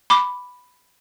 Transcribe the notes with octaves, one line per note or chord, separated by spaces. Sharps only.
B5 D6